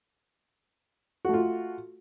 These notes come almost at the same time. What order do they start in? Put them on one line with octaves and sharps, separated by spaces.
F#4 A3 F4